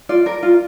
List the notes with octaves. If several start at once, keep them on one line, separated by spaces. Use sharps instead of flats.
F4 D5
A#4
F4